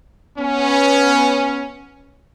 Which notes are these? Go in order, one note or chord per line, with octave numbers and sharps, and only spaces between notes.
B3 C#4